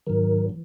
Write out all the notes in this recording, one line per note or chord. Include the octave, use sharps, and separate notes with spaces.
G#2 D#3 F#3 A#4
E3